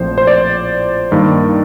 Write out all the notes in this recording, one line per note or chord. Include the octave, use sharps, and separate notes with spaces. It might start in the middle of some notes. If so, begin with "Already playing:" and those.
Already playing: A#1 A2 F3 C4 C5
C5
D5
G2 D#3 A#3